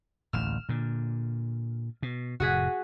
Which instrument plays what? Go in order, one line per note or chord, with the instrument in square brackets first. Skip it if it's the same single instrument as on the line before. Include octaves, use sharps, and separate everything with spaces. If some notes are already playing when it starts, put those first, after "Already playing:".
[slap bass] D1 A1 D#2 [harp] F6 E7
[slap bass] A#2 D3
B2
[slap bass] F1 A2 [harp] F#4 G#4 B6